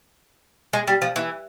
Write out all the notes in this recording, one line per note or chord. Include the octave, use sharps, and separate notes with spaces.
G#3
G3
F3
E3